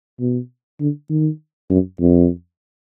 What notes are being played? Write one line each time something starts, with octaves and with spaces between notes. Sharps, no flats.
B2
D3
D#3
F#2
F2